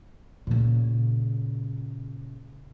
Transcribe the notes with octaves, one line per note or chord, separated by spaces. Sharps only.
A#2 C#3